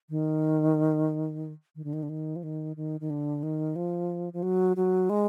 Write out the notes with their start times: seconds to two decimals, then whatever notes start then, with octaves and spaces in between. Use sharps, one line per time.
0.10 D#3
1.76 D#3
1.84 D3
1.93 D#3
2.03 D3
2.09 D#3
2.36 F3
2.43 D#3
2.76 D#3
3.01 D#3
3.10 D3
3.43 D#3
3.76 F3
4.33 F3
4.43 F#3
4.77 F#3
5.10 G#3